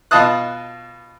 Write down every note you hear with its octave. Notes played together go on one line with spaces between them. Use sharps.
B2 F4 D#5 A5 D#6 F#6